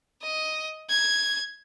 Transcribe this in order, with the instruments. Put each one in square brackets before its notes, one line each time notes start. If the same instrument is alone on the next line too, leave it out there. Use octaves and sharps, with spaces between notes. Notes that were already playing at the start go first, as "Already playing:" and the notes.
[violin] D#5
G#6